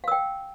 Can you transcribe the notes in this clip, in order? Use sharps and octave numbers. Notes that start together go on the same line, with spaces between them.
F5 G5 E6